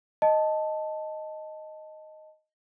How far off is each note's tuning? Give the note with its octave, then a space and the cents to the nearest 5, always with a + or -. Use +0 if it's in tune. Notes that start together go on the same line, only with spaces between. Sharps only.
D#5 +0 A5 +0